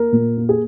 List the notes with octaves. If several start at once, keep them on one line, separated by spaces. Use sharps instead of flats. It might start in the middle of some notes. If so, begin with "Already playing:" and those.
Already playing: A#3 A#4
A#2
A#3
G#4